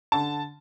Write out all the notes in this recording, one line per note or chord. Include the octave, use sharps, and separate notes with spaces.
D3 A5